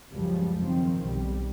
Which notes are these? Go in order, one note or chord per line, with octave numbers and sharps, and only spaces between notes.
C#2 F#2 C#3 F3 G3
F#1 D#3 F3 C4
B1 G3